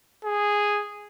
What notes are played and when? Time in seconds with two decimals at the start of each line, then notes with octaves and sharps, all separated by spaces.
0.25 G#4